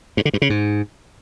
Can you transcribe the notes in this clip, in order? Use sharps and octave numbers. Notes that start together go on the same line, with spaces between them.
G2
D3
G2
C#3
G#2